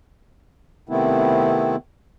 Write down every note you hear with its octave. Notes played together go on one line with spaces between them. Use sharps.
C3 D#3 A3 B3 C4 E4